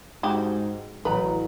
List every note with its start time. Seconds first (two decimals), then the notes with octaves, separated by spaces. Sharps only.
0.23 G#2 F#4 G4
1.05 A1 F#3 B4 A#5